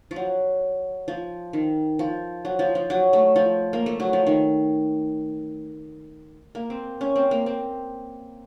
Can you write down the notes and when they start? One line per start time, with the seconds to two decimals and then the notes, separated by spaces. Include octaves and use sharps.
0.11 F3
0.16 F#3
1.08 F3
1.53 D#3
1.99 F3
2.45 F#3
2.59 F3
2.75 F3
2.90 F#3
3.13 A3
3.36 F3
3.73 A#3
3.86 A3
4.00 F#3
4.13 F3
4.27 D#3
6.55 A#3
6.70 C4
7.01 C#4
7.16 C4
7.31 A#3
7.46 C4